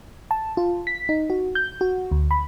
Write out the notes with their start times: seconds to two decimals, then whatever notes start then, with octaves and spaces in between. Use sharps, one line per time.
0.31 A5
0.57 F4
0.87 B6
1.09 D#4
1.30 F#4
1.55 G6
1.81 F#4
2.11 D2
2.31 B5